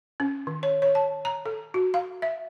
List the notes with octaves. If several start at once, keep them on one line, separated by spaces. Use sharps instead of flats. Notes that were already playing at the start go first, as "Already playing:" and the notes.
C#4
D#3
C#5
C#5
A5
A#5
A4
F#4
F5
E5